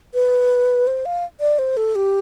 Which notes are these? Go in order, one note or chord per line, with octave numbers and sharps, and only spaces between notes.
B4
C5
F5
D5
C5
A4
G4